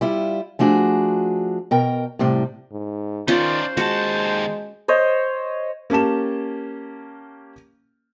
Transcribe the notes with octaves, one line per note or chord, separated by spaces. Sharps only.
G3 E4 F4
F3 A3 D4 F#4 G#4
B2 A#4 G5
A2 C3 G3
G#2
D#3 C#4 D#4 F4 C5 D5
D#2 G#3 F#4 A5
C5 C#5 D#5
A#3 C#4 G4 A5 E7